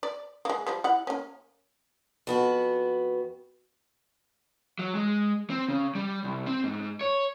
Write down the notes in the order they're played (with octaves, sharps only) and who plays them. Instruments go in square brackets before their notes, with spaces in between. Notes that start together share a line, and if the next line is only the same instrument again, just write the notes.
[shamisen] D5
G#3 A#3
F3 G3
E4 F#5
A#3 C#4
[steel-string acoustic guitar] F2 B3 F#4
[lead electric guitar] F#3
G#3
C4
C#3
G3
C2
C4
G#2
C#5